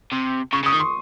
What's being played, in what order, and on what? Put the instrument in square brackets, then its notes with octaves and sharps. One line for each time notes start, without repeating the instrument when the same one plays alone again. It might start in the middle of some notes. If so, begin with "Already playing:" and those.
[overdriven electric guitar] C3
[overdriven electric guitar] C#3 [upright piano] C#6
[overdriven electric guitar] C#3
[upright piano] D#6
[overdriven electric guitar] D#3
[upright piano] C6